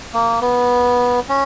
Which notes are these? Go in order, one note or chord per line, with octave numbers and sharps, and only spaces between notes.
A#3
B3
C#4